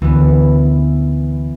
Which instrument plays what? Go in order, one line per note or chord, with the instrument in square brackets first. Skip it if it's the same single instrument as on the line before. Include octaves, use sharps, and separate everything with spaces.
[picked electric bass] D2 [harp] E3 B3